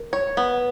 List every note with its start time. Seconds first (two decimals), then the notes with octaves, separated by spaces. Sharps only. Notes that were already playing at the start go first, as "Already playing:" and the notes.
Already playing: A#4
0.13 C#5
0.37 B3